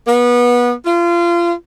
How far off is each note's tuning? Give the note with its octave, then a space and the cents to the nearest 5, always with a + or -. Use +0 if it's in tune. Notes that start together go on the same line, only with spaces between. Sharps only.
B3 -25
F4 -25